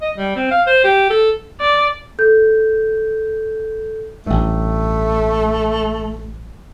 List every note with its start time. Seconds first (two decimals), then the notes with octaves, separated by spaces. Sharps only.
0.02 D#5
0.17 G3
0.36 C4
0.51 F5
0.67 C5
0.84 G4
1.10 A4
1.61 D5
2.19 A4 G6
4.26 A1 G2 A3